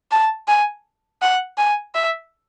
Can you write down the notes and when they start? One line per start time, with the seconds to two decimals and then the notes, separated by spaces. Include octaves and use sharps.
0.11 A5
0.48 G#5
1.22 F#5
1.58 G#5
1.95 E5